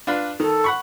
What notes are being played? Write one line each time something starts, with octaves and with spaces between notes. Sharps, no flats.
D4 F4 B4
D#3 A4
F#5 B5 C#6